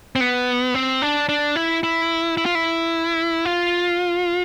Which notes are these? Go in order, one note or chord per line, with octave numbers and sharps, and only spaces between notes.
C4
B3
C4
D4
D4
E4
E4
E4
F4
E4
F4